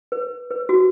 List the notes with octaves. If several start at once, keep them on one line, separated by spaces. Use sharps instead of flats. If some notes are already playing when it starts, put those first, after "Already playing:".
B4
B4
F#4